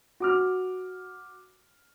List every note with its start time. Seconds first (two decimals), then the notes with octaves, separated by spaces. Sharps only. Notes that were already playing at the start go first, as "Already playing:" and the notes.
0.20 F#4 D6 F6